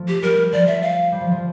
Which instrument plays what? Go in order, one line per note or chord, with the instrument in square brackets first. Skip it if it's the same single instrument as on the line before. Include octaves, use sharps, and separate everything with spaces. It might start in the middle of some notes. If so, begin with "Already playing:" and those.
Already playing: [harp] F3 A3
[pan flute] G4
[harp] G3 [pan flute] A#4
[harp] F3 [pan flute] D5
[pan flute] E5
F5
[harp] G3
F3
F3